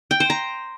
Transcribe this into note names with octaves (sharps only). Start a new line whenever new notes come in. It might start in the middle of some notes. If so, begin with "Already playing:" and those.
G5
C5
A#5